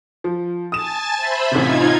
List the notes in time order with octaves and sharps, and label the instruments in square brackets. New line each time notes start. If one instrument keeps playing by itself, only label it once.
[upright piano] F3
[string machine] G#5 A5 A6 [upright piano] D#6 E7
[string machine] C5 E5 B5
[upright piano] A1 C3 [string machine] D#4 F4 G#6